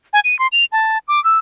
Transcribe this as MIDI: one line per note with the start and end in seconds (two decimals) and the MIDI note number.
0.13 0.20 80
0.24 0.38 99
0.39 0.47 84
0.52 0.65 101
0.72 0.98 81
1.08 1.22 86
1.24 1.39 88